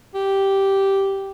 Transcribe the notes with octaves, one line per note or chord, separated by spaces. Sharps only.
G4